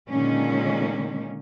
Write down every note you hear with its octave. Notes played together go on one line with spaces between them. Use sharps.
A#2 D3 D#3 G#3 A#3 C#4